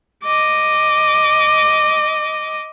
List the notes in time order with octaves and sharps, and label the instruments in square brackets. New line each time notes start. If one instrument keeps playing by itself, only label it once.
[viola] D#5 D6